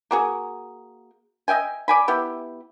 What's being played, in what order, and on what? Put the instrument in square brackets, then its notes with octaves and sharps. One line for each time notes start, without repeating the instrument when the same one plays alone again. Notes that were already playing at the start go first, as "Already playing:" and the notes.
[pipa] A#3 F#4 G#4
D#5 E5 G5 G#5
D5 G#5 B5
B3 E4 G4